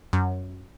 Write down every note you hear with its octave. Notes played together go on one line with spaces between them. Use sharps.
F#2